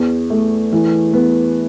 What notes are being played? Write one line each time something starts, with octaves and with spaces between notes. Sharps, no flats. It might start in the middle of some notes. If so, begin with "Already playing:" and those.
Already playing: E2
A3
E3
B3